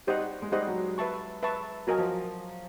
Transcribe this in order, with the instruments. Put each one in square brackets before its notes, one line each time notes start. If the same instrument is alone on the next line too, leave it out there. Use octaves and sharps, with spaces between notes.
[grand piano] G3 [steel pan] D#4 G4 C5 D#5 F#5
[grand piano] G#3
[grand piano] G3 [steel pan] D#4 G4 C5 D#5 F#5
[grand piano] F#3
[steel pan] B4 E5 A5 C#6
B4 E5 A5 C#6
[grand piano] F#3 [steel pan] F#4 A#4 D#5 G#5
[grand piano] F3